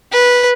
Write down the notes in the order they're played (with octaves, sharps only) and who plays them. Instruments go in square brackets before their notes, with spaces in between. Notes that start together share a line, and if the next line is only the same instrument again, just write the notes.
[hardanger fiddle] B4